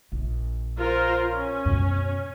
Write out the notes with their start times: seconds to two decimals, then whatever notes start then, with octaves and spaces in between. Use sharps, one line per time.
0.12 A#1
0.78 F4 A#4 C5
1.31 C#4
1.65 F#2 B2